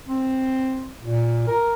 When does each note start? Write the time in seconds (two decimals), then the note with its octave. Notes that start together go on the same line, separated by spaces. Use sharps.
0.08 C4
1.02 A#2
1.47 A#4